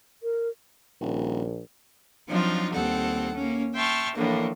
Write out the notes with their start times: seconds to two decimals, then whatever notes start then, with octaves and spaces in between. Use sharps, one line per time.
0.23 A#4
1.01 D#1 A#1
2.28 F3 F#3 C4 D4 D#4 F4
2.73 D#2 G3 C4 A4 F#5
3.35 A#3 C#4
3.74 E5 G5 A5 C6 C#6 F6
4.15 A2 D3 E3 F3 A#3 D4